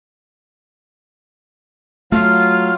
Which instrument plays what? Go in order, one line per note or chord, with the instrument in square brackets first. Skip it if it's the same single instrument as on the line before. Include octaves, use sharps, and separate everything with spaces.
[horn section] F#3 F4 [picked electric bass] A3 [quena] F6